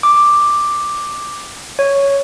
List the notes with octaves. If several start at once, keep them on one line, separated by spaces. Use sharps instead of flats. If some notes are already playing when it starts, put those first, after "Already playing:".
D6
C#5